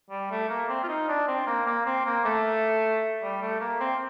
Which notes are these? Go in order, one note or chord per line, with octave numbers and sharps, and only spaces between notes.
G3
A3
A#3
C4
F4
D#4
D4
C4
A#3
A#3
C4
A#3
A3
G3
A3
A#3
C4